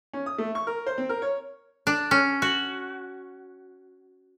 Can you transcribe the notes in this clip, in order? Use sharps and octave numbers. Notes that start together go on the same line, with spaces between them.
C#4
D#6
A3
C#6
A#4
C5
C4
A#4
C#5
D4
C#4
F#4